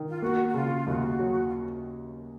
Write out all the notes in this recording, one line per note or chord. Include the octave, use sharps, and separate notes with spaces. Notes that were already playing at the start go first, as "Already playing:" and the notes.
Already playing: D#3
F4
A#3 F#4
F#4
C#3 F4
D#2 F#4
F#3
F4